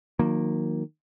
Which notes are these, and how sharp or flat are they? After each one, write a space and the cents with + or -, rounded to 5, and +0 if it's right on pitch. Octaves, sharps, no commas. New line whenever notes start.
D#3 +0 F#3 -35 A#3 +0